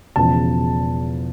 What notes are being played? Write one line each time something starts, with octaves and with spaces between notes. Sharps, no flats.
E1 E2 C#3 F3 A5